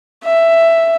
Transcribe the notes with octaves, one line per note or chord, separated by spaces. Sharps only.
E5